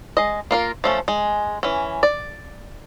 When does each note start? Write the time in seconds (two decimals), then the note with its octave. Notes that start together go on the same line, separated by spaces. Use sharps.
0.17 G#3 D#5
0.51 A#3 F4 A#4
0.84 F3 A3 C#4
1.08 G#3
1.63 E3 C#4
2.03 D5